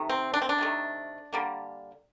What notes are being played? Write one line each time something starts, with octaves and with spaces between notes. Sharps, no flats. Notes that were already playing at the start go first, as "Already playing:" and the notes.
Already playing: C3 D#3 A3
C4
D4
C4
D4
C3 D#3 A3
D3 G3 A#3